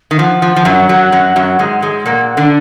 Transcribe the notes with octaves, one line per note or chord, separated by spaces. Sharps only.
D#3
F3 F#5
F3
F3
F#2 F#3
F#2 F#3
F#2 F#3
F#2 F#3
G#2 G#3
G#2 G#3
A#2 A#3 F#5
F#5
D3 D4